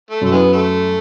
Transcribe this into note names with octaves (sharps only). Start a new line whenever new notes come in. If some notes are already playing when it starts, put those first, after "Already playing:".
A3
F#2 A3
E3 G#3 B3
A3